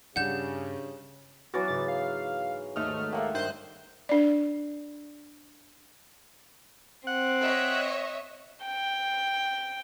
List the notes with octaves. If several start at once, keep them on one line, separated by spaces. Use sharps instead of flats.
G2 C#3 D4 G4 F#5 G6 E7
E3 F#3 B3 F#4 D6 F6 A6
G#2 C#3 A6
F5
D#2 G#2 A3 D#5 A5 F6
A#3 E5 F#5 G5
G2 D#3 C5 F#6 D#7
D4 D5
C4 F#5
C#5 D#5 E5
G5